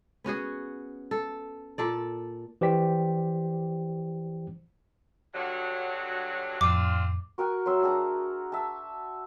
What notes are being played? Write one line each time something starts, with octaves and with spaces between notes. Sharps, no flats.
B3 C#4 F#4 G#4
A4
A#2 A4 D5
E3 G4 C5 D5 G5 B6
G2 D3 F#3
F2 A2 C4 D4 F4 D6
F#4 A#4 F#5 G#5
F#3 E5 C6 E6
D4 F#4 G#4 A#5
E5 A5